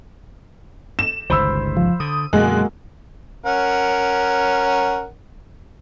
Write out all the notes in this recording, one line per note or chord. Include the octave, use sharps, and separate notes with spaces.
E7
G1 C#2 D#3 C5 B5 E6
F3
D3 D#6
F#2 B2 D3 G#3 A#3 F#4 F#6
C#4 A#4 F#5